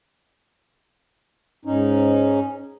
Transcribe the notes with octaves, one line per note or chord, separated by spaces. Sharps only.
G#2 C#4 D#4